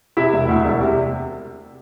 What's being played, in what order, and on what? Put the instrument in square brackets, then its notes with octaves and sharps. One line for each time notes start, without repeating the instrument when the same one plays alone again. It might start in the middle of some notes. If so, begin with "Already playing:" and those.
[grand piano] C3 E4 E5
E1
D2
E1
C3